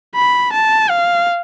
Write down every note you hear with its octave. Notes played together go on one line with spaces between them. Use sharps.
B5
A5
F5